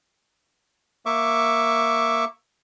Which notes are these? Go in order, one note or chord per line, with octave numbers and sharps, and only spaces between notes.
A#3 E5 C#6 D6